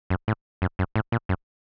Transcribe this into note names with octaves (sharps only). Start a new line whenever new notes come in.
F#2
A2
F#2
F#2
A2
A#2
F#2